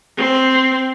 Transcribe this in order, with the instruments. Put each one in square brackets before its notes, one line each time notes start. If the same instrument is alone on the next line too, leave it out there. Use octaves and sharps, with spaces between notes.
[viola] C4